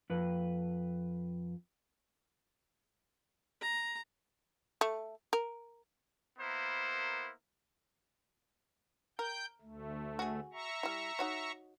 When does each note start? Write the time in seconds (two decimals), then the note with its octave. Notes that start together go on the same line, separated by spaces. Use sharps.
0.10 F2 B4
3.61 A#5
4.81 A3
5.33 A#4
6.38 A#3 B3 E4 A#4 C5
9.19 A#4 G5 G6
9.61 D2 A3
10.19 F#4 G#4
10.53 E5 A#5 C#6
10.83 G3 E4
11.19 D#4 F#4 C#5